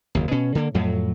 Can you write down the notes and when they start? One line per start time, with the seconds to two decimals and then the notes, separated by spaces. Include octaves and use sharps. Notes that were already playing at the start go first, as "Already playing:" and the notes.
0.15 F#1 D#2
0.31 B2 C#4
0.55 D3 A#3
0.74 F2 A2 F#3